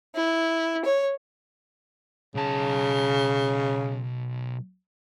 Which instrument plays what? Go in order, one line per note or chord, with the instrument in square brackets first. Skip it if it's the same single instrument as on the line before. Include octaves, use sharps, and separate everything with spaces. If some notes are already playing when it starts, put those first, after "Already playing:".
[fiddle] E4
C#5
[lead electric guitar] B1 A5 [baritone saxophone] C#3